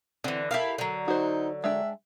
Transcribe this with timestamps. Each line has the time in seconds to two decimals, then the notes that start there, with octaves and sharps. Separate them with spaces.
0.24 D3 E3 C4
0.51 E4 G4 A4 A#4 F5
0.78 D3 F#3
1.08 D#4 F#4 C5
1.64 G#3 D4 E5 G5